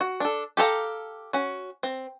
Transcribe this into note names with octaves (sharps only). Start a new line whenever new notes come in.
F#4
D4 A4
G4 A4 A#4 F5 A#5
C#4 F#4
C4